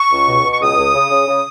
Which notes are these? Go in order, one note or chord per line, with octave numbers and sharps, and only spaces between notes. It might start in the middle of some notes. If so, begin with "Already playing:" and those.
Already playing: C#6
C#2
B2
B2
C#6
C#2 D#6
C#2
C#3
C#3
C#3